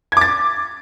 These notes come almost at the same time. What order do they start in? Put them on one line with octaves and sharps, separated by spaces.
G#6 D6 A6